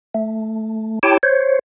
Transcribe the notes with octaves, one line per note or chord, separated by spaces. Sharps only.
A3
E4 G4 C#5 G5 A5
C5 C#5